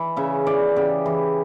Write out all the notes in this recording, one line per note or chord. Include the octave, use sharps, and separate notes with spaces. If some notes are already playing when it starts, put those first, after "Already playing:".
Already playing: E3
C#3 E5
E3 D5
C#3 G4
E3